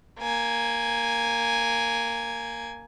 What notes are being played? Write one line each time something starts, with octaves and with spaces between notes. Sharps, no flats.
A#3 G#5